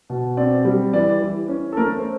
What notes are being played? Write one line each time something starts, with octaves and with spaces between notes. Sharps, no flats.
B2
C4 D5
G3
E3 D5
E3
C#4
A4
A3 A#4
C5